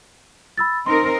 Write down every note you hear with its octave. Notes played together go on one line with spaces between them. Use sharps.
B5 E6 A6
C4 D#4 A#4 C6